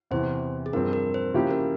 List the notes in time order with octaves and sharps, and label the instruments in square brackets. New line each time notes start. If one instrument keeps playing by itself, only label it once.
[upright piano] E2 C3 E3 [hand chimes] C5
[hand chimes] G#4
[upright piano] G2 F3 C4 [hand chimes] A#4
[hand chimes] A#4
C5
[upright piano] C#3 F3 A#3 E4 G4
[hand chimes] A#4